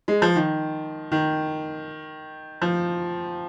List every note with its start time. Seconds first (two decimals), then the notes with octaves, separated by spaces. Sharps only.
0.08 G#3
0.22 F3
0.36 D#3
1.12 D#3
2.62 F3